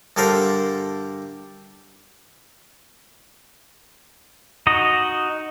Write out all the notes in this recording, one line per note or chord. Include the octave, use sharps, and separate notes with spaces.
G2 D3 A4 A#4 C5
D#4 F#4 D#5